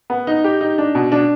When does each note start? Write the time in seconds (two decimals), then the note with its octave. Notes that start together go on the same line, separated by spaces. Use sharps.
0.10 B3
0.27 D#4
0.44 G4
0.61 D#4
0.78 D4
0.95 B2
1.12 D4